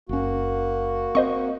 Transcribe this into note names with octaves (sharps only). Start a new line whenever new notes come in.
F#1 A#3 C#4 F#4
C4 C5 D#5 C#6